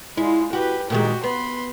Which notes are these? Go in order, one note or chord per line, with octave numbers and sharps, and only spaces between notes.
G#3 E4 F4
F#4 G4 B4
A#2 D#3 G#3 F#4 G4
B3 B5 C6